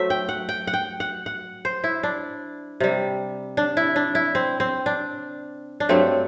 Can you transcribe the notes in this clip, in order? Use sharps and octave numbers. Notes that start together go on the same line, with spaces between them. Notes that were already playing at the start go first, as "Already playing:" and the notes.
Already playing: F#3 A3 C5 E5
G5
F#5
G5
F#5
G5
F#5
F#5
C5
E4
D4
C3 G3
D4
E4
D4
E4
C4
C4
D4
D4
G2 F#3 A3 C4